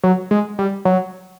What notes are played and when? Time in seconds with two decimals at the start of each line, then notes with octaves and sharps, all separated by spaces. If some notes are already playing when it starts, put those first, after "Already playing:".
0.04 F#3
0.31 G#3
0.59 G3
0.85 F#3